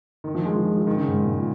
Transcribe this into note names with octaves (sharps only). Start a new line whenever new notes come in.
D#3
F3
G#3
F3
G#3
F3
D#3
C#3
G#2
A#2
G#2
A#2